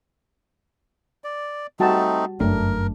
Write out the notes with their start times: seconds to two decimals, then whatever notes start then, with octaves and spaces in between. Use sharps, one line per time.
1.24 D5
1.80 G3 A3 C4 D#4 F#4 A5
2.40 G1 F#2 A3 D4 A#4